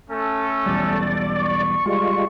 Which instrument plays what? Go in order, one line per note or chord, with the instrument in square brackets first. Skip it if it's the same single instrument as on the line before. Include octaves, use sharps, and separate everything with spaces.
[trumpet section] A3 C#4 A4
[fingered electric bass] B1 E2 G3 [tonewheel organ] D5
[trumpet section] C#6
[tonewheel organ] G3 G#3 F4